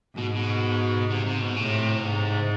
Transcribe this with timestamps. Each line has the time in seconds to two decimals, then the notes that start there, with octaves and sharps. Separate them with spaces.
0.17 G#2 B2
0.35 B2
1.10 C3
1.26 C3
1.41 B2
1.56 A2 C3
2.04 G#2